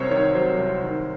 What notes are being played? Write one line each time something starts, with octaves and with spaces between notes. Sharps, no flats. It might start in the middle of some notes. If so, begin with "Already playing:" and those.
Already playing: C2 C3 F#3 A#4 C5 C#5
D#3 C#5
F#3 C5
C2
D#3